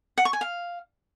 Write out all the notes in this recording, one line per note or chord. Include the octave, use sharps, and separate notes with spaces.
F#5
C#6
G#5
F5